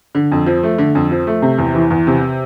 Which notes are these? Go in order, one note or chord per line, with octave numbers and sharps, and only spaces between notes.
D3
F2
F3
A3
D3
F2
F3
A3
C3
E2
E3
E2
C3